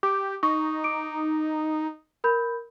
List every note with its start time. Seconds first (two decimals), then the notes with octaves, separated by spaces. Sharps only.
0.03 G4 D6
0.43 D#4 C#6
0.84 D6 D7
2.24 A#4 B5 G6